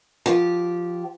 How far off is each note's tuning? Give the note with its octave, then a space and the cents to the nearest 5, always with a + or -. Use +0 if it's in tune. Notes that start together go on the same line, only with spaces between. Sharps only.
F3 +0 G4 -10